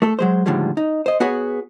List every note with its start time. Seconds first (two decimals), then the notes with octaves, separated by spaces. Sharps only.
0.02 A3 A4
0.19 F#3 G#3 C5
0.46 A2 D3 D#3 F3 G3 G#3
0.77 D#4
1.06 C5 D#5
1.20 B3 F#4 G#4 B4 C#5